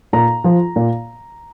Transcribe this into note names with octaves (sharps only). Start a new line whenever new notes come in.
A#2 A#5
F3
A#2